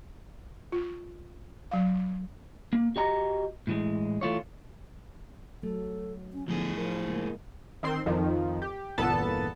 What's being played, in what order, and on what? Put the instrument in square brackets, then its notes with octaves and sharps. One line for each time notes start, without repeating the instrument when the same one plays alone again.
[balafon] F4
F#3 F5
[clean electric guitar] A#3
F#4 G4 D#5 A#5
A2 E3 G#3
E3 A3 F4 C#5
[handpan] F#3 [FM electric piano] A3 [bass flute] A4
[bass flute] C#4
[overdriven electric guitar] A2 G#4 [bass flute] D3 [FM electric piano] F3 B3
[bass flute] F3 [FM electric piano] A#4
[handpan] C#3 G#3 A#3
[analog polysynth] D#3 C4 C6
F2 D#3 F3
G4
G1 E2 A#2 B3 A4 A5